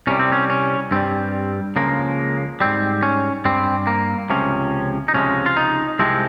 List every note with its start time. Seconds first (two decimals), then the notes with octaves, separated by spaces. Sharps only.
0.07 C2 C3 G3 C#4
0.19 C4
0.32 C#4
0.50 C#4
0.91 G2 G3 C4
1.76 C#2 C#3 F3 G#3 A#3
2.60 G#2 G3 C4
3.03 C#4
3.45 G2 G3 C4
3.87 A#3
4.30 C#2 C3 F3 C#4
5.08 D#4
5.14 C#2 C3 F3 G#3 C#4
5.46 F4
5.57 D#4
5.99 C2 C3 F3 G#3 C4